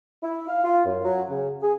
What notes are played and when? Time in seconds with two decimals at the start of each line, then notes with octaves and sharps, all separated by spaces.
0.23 E4
0.48 F5
0.64 F4
0.85 F#2
1.04 F#3
1.29 C#3
1.63 G#4